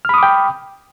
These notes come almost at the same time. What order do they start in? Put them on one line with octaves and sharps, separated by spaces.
F6 B5 D#6 D6 G5